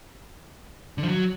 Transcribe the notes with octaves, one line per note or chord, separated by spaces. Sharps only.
D3
F3
F#3